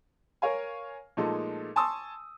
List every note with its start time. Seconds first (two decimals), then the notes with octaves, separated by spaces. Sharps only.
0.42 A#4 C#5 F5 G#5
1.17 A#2 F3 G#3 A3 D#4 A4
1.76 G#5 A5 C6 C#6 D#6 E6